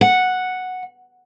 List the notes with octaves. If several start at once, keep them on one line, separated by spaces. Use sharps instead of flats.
F#5